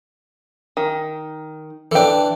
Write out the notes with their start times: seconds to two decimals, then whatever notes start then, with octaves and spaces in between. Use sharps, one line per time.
0.77 D#3
1.92 E3 D4 A4 G5